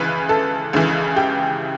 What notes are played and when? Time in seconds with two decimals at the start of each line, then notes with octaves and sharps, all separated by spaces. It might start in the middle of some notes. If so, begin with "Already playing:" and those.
Already playing: C#2 C#3 E3 B4
0.29 A4
0.73 C#2 C#3 E3
1.16 G4